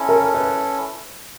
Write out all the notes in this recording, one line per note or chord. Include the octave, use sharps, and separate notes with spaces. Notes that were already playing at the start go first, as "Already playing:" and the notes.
Already playing: C#4 E4 A4
A#4
B4